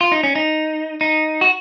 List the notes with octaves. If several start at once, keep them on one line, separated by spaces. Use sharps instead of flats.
F4
D#4
C#4
D#4
D#4
F#4